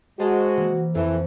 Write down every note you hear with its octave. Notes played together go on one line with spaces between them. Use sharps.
G#3 F#4 C5 A5 A#5
E3 A#3
F2 E3 E4 A4